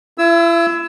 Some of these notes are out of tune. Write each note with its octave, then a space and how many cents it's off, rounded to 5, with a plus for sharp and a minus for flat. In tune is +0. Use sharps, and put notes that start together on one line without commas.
E4 +40 E6 +0